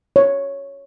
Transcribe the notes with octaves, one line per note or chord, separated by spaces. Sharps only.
C#5